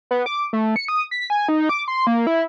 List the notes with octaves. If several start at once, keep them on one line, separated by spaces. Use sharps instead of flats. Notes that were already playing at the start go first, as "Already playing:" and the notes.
B3
D6
A3
C#7
D#6
B6
G#5
D#4
D6
C6
A#3
E4